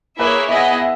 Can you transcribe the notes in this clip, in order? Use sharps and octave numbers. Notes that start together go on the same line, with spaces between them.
A#3 E4 G#4 B4 C#5 E5
B3 E4 G#4 D#5 E5
E5